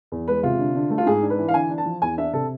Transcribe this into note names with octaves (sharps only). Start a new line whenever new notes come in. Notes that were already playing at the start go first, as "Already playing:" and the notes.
E2
G#3 B4
C3 F4
D3
D3
A3
F4
G#2 G#4
D4
B4
E3
F5
D3 G#5
D4
A5
F3
E2 G#5
D4 E5
C3 A4